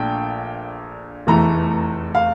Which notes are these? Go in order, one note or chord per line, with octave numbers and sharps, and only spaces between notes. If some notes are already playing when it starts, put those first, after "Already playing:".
Already playing: A#1 A#2 A3 D4 G5
F1 E2 E3 A3 A#5
F5